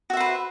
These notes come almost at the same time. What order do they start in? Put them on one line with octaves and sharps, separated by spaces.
F#4 E5 C5 B4